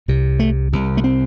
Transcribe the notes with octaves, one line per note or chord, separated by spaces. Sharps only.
C2 C3
A3
C2 C3
A3
C4